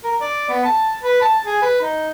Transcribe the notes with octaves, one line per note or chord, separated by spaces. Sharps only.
A#4
D5
B3
A5
B4
A5
G#4
B4
D#4